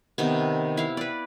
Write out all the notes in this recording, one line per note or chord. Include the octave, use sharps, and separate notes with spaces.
C3 D#3 B3
E4 F5
B4 D5